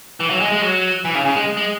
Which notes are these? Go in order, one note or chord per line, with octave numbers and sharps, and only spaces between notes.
E3
F#3
G#3
G#3
F#3
E3
C#3
C#3
G#3
G#3